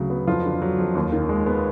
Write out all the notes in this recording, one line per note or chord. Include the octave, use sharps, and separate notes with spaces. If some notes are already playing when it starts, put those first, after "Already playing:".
Already playing: D2 C#3 F#3
B3
F2 F4
D3
F#3
F2
D#2
D#3
G#3
B3